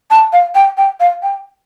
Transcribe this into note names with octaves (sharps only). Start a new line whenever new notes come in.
A5
F5
G5
G5
F5
G5